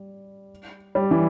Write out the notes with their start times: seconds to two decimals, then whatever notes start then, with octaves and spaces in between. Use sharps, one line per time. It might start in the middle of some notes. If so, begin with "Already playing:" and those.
Already playing: G3
0.95 G3
1.11 E3